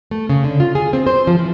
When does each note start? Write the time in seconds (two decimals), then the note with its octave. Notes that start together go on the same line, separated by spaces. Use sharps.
0.11 A3
0.29 C#3
0.44 D3
0.60 F4
0.75 G#4
0.93 C4
1.07 C5
1.27 F3
1.39 E3